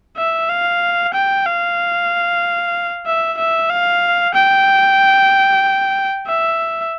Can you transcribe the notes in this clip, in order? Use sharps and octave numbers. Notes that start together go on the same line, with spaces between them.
E5
F5
G5
F5
E5
E5
F5
G5
E5